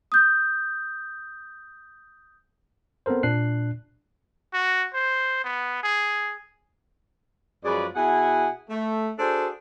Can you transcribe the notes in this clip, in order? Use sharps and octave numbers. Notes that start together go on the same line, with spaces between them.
D#6 G6
B3 C4 A4 A#4 C5
A#2 D4 F#6 C7
F#4
C5
B3
G#4
F#2 F3 G#3 G#4 B4 D5
B2 E4 G#4 F#5 G#5
A3
D4 F#4 G#4 A4 C5